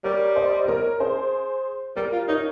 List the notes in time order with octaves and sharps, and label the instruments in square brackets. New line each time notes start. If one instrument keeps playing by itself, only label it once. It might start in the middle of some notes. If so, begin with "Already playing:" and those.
[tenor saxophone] G3 [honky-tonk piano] A#4 C#5
[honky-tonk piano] C5 D#5
D#5
A#4 C#5
G#4 C5
[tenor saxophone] G3 [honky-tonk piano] G4 A#4
[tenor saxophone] F4
[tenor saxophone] D#4 [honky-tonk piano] A#4 C#5